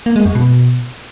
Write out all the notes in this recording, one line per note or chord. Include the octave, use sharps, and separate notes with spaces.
A#3
G#3
F#2
B2